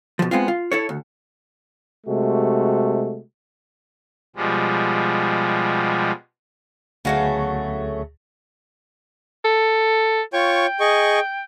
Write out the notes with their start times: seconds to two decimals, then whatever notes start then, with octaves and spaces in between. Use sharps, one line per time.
0.19 B2 F3
0.31 G#3 B3 C4 F4
0.48 F4
0.72 E4 A4 C#5
0.89 D2
2.06 C3 G#3 A3 F#4
4.36 B2 F3 G3 G#3
7.05 D2 C#3 F#3 A3 B3 F5 F#5 A#6
9.45 A4
10.33 F4 C#5 G5 C#6
10.80 G#4 D#5 C#6